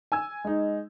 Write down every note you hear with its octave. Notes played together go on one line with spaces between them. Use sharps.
G#5 E6 G#6
G#3 D#4